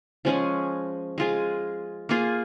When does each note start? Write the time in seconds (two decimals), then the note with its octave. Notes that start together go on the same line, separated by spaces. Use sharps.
0.25 F3 G#3 C#4 G#4
1.18 G#3 F4 G#4
2.09 A#3 F4 G#4